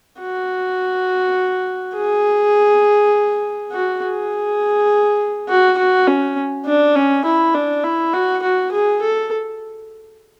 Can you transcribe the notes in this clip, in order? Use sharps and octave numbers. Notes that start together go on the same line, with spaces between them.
F#4
G#4
F#4
G#4
F#4
F#4
C#4
D4
C#4
E4
D4
E4
F#4
F#4
G#4
A4